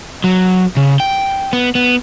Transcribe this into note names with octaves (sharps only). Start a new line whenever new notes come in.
F#3
C#3
G5
B3
B3